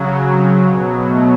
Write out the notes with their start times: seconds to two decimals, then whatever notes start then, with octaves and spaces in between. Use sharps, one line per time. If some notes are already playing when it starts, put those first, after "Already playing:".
Already playing: C#3 F#3
0.30 C4
0.68 B2 F#3
1.06 A3